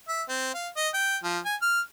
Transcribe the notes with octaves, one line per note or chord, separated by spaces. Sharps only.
E5
C4
F5
D#5
G5
F3
G#5
F6